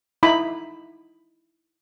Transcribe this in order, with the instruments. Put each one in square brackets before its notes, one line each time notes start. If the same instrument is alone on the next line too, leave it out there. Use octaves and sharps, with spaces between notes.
[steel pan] D#4 E4 B5